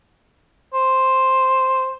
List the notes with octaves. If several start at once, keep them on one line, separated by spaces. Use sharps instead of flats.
C5